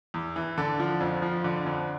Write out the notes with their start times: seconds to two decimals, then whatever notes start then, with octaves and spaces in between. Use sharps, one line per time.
0.14 E2
0.36 E3
0.58 D3 A4
0.80 F3
1.00 F2
1.22 F3
1.44 D3
1.66 F2